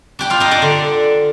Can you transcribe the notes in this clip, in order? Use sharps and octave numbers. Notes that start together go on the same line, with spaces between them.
D4 G4 G5
F4 F5
D4 D#4 D#5
D4 D5
D3